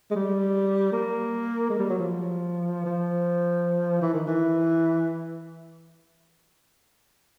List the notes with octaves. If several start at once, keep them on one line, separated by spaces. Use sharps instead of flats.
G#3
G3
A#3
G#3
G3
F#3
F3
F3
E3
D#3
E3